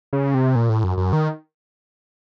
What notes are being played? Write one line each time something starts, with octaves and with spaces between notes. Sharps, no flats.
C#3
C3
A#2
A2
F#2
F#2
D#3